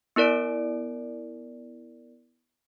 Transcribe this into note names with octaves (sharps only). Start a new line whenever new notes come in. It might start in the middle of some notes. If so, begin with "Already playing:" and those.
B3 E4 A#4 D5 D7